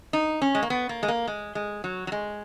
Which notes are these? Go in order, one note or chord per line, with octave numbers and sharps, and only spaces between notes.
D#4
C#4
G#3
A#3
B3
A#3
G#3
A#3
G#3
G#3
F#3
F#3
G#3